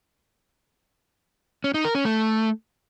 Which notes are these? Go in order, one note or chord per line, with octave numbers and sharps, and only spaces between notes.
C#4
D#4
A#4
C#4
A3